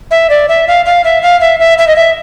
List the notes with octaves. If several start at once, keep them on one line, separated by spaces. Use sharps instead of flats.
E5
D5
E5
F5
F5
E5
F5
E5
E5
E5
D#5
E5